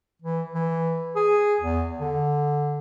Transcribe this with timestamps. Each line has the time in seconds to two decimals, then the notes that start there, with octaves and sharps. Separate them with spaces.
0.22 E3
0.55 E3
1.16 G#4
1.61 E2
2.00 D3